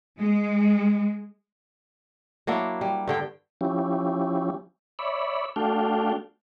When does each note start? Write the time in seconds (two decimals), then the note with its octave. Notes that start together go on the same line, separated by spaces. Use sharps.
0.19 G#3
2.47 F#3 A#3 D4 E4
2.81 G3
3.08 G2 D3 G5
3.61 F3 C#4 E4 G4
4.99 C#5 D5 E5 B5
5.56 A3 D4 F#4 A4 F5 G5